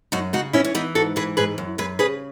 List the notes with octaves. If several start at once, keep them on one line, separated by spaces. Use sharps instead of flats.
F#2 D#4 F#4
C#3 D#4 F#4
E3 C#4 E4
C#4
E3 B3 D#4
G#2 F#4 A4
E3 G#4 B4
G#2 G#4 B4
F#2
F#2 G#4 B4
C#3 G#4 B4